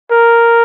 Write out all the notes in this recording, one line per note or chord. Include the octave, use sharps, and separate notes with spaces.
A#4